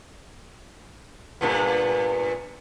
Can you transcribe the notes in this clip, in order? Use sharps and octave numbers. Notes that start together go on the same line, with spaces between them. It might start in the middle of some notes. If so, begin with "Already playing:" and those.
G2 A#2 B3